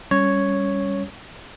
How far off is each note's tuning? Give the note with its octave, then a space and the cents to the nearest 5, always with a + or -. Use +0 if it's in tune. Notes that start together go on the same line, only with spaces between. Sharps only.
G3 +10 C#4 +0 C#5 +0